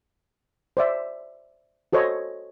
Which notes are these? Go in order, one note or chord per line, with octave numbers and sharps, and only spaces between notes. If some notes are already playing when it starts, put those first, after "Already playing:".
C5 D5 E5
F#4 A4 C5 C#5 D#5